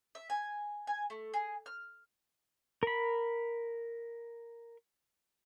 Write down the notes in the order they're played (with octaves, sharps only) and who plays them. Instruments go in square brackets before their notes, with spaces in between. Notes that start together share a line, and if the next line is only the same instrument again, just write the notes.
[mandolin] E5
G#5
G#5
A3
G#4
F6
[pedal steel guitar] A#4 B5